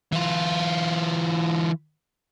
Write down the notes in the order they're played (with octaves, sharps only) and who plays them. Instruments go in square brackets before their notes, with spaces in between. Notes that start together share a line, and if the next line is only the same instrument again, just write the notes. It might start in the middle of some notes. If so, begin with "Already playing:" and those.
[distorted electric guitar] E3 F4